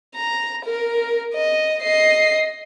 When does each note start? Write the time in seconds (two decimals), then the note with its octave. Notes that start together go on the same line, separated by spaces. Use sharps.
0.16 A#5
0.65 A#4
1.35 D#5
1.83 D#5 C7